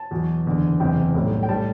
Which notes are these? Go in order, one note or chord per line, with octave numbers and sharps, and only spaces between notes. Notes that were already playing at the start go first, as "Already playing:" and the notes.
Already playing: A5
E2 B2 F#3
F#1 E2 D3
F#1 E2 C3 G5
B1 A2 G3
G5
A2 G3 A5